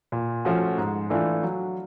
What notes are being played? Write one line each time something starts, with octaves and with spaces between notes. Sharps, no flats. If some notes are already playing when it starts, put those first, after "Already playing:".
A#2
F3 A3 C#4 F#4
G#2
E3 A3 D4 F4
F#3